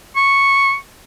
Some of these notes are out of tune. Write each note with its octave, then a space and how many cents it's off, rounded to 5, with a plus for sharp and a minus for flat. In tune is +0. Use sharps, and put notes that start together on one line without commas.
C#6 -5